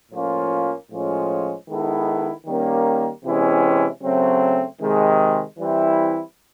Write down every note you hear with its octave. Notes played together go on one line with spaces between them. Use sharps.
A2 F3 A#3 C#4 F4
A2 F3 G#3 C#4 F4
D#3 G#3 B3 E4 A4
D#3 G3 A#3 C#4
C3 E3 G#3 C#4 E4
C#3 F#3 A3 C4
C3 D#3 G#3
E3 G3 C4 E4